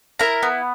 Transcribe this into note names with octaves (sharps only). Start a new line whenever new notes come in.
E4 A#4 A#5
B3